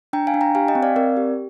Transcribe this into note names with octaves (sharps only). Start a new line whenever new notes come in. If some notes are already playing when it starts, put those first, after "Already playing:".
D4 G5 A#5
F5 G#5
D4
G5 A#5
G4 F5 G#5
D#5 G5
C4
D5 F5
C4 A#4 D5
G4